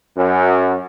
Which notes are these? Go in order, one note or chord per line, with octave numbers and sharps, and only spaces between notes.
F#2